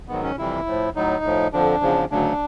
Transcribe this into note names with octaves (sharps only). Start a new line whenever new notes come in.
G#2 D#3 F#3 B3
C#4
F2 C3 E3 G3 E4
A2 F3
A2 F#3 D#4
A2 F3
F2 D3 F3 D4
E2 C#3 F3
D2 C#3 F#3 D4